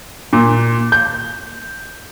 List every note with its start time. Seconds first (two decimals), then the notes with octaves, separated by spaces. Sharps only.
0.33 A#2
0.92 G6